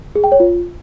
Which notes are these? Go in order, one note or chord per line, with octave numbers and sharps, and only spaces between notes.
G#4
G5
C#5
F4